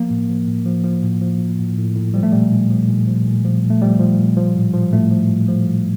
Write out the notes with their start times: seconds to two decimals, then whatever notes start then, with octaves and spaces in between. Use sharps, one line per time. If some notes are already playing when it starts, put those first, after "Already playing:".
Already playing: F3 A#3
0.10 A2
0.29 F3
0.47 A2
0.66 F3
0.84 F3
1.03 A2
1.21 F3
1.41 A2
1.59 A2
1.77 A2
1.96 A2
2.14 F3 G3
2.23 A3
2.32 A#2 G3
2.52 A#2
2.70 F3
2.88 A#2
3.07 F3
3.26 A#2
3.45 F3
3.63 A#2
3.70 A3
3.82 F3 G3
4.00 F3
4.19 A#2
4.37 F3
4.56 A2
4.74 F3
4.93 A2 A3
5.11 F3
5.30 A2
5.49 F3
5.66 F3